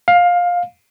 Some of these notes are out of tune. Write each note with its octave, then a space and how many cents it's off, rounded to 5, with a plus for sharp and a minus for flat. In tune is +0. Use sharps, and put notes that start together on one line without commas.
F5 +15